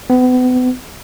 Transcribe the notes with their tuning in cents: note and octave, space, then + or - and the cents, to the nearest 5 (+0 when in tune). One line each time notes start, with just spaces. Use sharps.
B3 +35